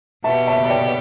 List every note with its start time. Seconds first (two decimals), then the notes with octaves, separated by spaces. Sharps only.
0.24 B2 B3 G4 E5 A5
0.48 E5 A5
0.64 A5
0.70 D5 G5